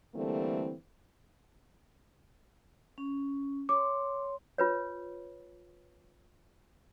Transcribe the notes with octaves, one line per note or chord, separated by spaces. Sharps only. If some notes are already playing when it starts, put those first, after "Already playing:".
D3 E3 G3 A3 A#3 C4
C#4
C#5 C6 D6
F4 B4 C#5